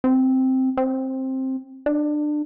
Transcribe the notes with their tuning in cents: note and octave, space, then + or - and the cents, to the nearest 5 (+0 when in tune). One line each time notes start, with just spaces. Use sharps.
C4 +0
C4 +10
D4 +25